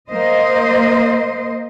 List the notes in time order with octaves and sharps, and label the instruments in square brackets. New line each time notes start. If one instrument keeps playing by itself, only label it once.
[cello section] A#3 C5 D#5